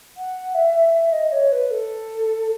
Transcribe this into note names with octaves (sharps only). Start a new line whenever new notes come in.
F#5
E5
E5
D#5
C#5
B4
A4